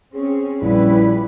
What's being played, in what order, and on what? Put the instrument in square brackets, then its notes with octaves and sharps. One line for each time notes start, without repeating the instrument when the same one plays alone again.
[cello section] C4 C#4 [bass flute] G#4
[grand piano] A#1 [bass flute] G3 [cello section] C#4 B4 [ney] E4